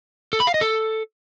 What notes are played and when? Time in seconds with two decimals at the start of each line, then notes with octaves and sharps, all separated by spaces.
0.33 A4
0.40 B5
0.47 F5
0.54 D#5
0.61 A4